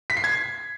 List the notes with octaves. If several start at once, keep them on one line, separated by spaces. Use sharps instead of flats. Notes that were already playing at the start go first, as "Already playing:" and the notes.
B6
C7
G#6